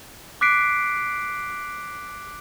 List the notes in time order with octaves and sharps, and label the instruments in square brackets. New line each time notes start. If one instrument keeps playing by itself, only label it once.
[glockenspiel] D6 F#6 B6 C7 D7